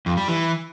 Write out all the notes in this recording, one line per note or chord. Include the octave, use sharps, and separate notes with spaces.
F2
G3
E3